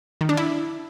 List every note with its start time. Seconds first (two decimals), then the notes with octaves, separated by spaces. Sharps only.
0.21 D#3
0.29 D4
0.37 E4